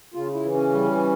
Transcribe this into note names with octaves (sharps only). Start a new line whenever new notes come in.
C#3 F4
E4
E3
C#4
G3